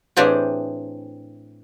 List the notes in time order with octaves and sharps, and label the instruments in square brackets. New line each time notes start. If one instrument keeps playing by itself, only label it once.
[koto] A2 E3 C4 D4 G4 G#4